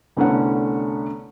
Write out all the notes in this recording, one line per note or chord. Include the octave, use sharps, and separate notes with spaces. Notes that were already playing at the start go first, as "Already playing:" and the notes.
C2 D3 A3 B3 C#4 F#5